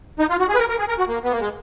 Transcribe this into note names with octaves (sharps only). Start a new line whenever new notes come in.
D#4
F4
F#4
G#4
B4
A#4
A#4
G#4
A#4
F#4
A#3
B3
A#3
G#3